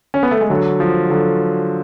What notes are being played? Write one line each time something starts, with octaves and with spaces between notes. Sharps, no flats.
C#4
B3
A3
G#3
D3 F#3
F3
D3 F#3